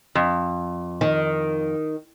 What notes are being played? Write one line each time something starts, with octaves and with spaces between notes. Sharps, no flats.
F2
D#3